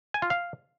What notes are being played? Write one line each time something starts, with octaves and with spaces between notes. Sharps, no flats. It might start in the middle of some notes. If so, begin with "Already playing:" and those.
G#5
F4
F5